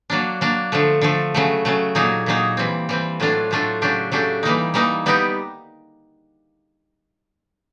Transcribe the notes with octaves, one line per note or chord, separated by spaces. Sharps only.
F#3 A#3 D4
F#3 A#3 D4
D3 F3 A3
D3 F3 A3
C#3 F#3 A3
C#3 F#3 A3
A#2 F#3 A#3 D#4 G#4
A#2 F#3 A#3 D#4 G#4
E3 G3 C4
E3 G3 C4
A2 F#3 A3 D4 F4
A2 F#3 A3 D4 F4
C#3 F#3 A3 D4 G4
C#3 F#3 A3 D4 G4
E3 G3 A#3 D#4
E3 G3 A#3 D#4
G3 B3 D#4 G4